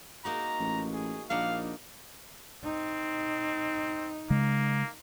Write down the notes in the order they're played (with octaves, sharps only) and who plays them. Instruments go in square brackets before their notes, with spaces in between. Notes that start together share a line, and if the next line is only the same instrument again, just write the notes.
[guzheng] A#3 D#4 F#4 [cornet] A#5
[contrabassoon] A1
[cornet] G#4
[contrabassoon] A#1 [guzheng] A#3 D4 F#5 [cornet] D#4 [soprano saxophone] F5
[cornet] C4 [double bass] D#4
[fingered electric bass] C#3 G#3 [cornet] A#3